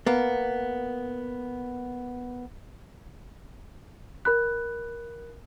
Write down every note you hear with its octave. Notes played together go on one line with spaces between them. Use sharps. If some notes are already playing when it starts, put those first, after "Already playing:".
A#3 B3
A#4 B5 F#6